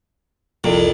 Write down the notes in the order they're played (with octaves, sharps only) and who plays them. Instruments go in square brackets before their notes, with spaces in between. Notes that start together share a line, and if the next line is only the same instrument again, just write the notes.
[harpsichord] C2 F2 C3 [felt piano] F3